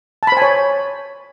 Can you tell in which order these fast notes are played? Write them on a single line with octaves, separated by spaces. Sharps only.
A5 B5 C5 G#5 C#5